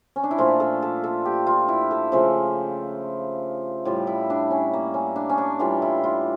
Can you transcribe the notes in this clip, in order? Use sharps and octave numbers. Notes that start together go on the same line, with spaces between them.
C#4
D4
E4
A#2 F3 A3 F4
A4
A4
A4
G4
F4
E4
A4
C#3 F3 A3
A2 G3 F4
E4
D4
C#4
A#3
C#4
D4
C#4
D4
A2 E3 G3 F4
E4
F4